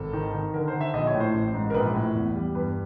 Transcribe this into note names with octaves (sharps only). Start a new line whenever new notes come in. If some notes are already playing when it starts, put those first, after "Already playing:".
Already playing: G#1 A4
D#3
D#3
D3 A#4
C5
D3
E5
A#1 D#5
C#5
A2
C5
A1
G#2
A#4
A#1 B4
A2
E2
G3
G2 B4